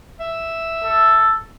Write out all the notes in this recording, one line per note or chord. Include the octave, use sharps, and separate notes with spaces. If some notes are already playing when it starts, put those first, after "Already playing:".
E5
A4